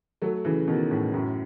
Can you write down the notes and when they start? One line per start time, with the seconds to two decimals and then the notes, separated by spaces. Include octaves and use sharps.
0.22 F#3 A3
0.45 C#3 E3
0.67 B2 D#3
0.91 A2 C#3
1.14 F#2 A2